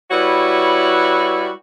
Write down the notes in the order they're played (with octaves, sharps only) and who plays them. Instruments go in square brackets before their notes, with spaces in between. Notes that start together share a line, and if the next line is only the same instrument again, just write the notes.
[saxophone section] G3 E4 F#4 B4 C#5